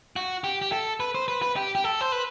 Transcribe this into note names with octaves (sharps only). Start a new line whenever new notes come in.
F#4
G4
G4
A4
B4
C5
B4
B4
G4
G4
A4
C5
B4